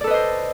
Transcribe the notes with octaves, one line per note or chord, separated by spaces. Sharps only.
A4 B4 C5 D5 D#5